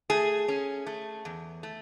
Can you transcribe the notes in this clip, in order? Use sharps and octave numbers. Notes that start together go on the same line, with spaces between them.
A3 G#4
C#4
A3
E2
A3